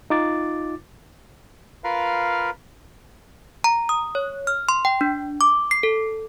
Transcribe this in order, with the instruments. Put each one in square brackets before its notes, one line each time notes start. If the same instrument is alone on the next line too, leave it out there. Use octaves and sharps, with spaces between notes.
[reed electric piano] D#4 F4 D6 A6
[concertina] F4 A#4 B4 F5
[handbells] A#5
D#6
C#5
F6
C6
G5
D4
D6
C7
A4